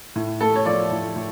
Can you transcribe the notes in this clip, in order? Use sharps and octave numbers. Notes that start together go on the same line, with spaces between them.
A2
A3 A4
C#5
F3 D5
A2
A2